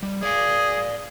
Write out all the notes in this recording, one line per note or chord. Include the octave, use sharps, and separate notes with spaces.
G3
G#4 D5 F5